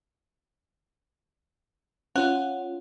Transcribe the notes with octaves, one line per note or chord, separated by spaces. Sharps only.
C#4 F4 F#5